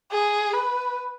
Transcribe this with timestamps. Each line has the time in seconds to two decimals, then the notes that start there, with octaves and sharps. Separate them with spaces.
0.12 G#4
0.54 B4